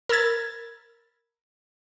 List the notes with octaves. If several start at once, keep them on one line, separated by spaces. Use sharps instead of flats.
A#4 B5 E6 G#6 A6